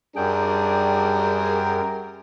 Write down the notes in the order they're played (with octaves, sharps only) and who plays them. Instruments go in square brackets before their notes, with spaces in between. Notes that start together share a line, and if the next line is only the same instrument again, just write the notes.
[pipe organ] F#2 G5 [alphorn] G3 [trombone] D4 [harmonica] G#4 A#4